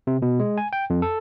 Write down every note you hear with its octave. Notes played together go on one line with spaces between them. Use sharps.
C3
B2
G#3
G#5
G5
F2
A4